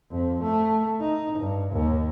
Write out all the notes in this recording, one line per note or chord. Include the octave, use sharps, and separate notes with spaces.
F2
A3
D#4
G2
D#2